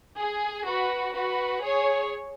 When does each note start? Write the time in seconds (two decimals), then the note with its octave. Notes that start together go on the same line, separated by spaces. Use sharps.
0.19 G#4
0.66 F#4 B4
1.14 F#4 B4
1.62 G#4 C#5